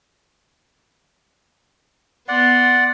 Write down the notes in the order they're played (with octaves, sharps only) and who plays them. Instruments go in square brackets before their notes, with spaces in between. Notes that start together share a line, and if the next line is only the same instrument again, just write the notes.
[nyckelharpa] B3 C6 [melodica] D5 F#5